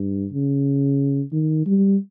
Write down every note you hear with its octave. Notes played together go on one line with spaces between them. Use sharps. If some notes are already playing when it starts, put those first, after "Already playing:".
Already playing: G2
C#3
D#3
G3